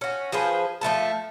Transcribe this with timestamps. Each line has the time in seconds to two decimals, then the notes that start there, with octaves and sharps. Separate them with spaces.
0.01 C#4 F#4
0.32 F3 G#4 B4 C5
0.81 F3 A3 B3 A5